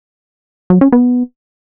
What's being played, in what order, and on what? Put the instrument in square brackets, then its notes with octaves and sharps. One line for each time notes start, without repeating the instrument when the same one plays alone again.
[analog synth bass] F#3
C#4
B3